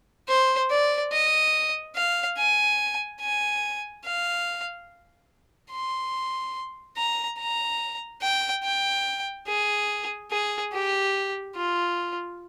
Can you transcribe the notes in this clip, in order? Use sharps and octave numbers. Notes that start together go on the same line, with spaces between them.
C5
D5
D#5
F5
G#5
G#5
F5
C6
A#5
A#5
G5
G5
G#4
G#4
G4
F4